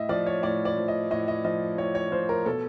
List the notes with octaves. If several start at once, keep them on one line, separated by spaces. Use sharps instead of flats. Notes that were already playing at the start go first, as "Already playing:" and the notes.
Already playing: A2 D#5 E5
F3 D5
C#5
A2 D5
D5
F3
D#5
A2 D#5
D#5
F3 D#5
A2 C#5
C#5
F3 C5
A#4
B2 A4